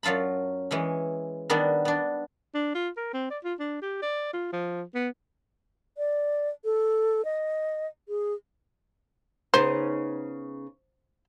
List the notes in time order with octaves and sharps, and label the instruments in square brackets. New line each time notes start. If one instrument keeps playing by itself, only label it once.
[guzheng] F#2 F#3 F4 A5 B5
E3 G#3 C#4
D#3 G3 B3 D4
B3 D4
[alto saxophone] D4
F4
A#4
C4
D5
F4
D4
G4
D5
F4
F3
B3
[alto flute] D5
A4
D#5
G#4
[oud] C#3 B3 D#4 [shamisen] C5